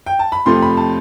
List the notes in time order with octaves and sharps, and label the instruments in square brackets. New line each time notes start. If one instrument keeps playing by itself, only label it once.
[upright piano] G5
A5
B5
F2 C3 F3 A3 C6
B5
A5